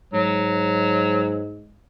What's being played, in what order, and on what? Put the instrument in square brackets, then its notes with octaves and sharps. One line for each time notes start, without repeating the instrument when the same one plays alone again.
[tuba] G#2 [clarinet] F#3